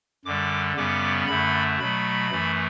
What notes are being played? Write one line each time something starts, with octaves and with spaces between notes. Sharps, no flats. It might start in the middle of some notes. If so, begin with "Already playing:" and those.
F#2 D3 G3 D6
F#2 C#3 G3 B3 D6
F#2 D3 A3 B5
B2 F#3 A3 B5
F#2 E3 A3